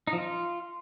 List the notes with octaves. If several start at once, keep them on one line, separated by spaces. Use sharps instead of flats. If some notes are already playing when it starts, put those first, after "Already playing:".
D#4
F3
F4